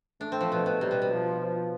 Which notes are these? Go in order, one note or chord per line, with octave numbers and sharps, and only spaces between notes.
A3 D4
C4
F3
B2
B2
C3 G3
B2
B2
F3
F3